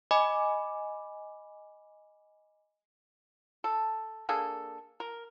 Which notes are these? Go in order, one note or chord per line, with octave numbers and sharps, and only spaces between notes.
D#5 G#5 B5 D6
A4
A#3 D4 G#4 A4
A#4